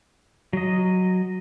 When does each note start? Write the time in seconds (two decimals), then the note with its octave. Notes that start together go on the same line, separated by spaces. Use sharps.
0.53 F#3 D#5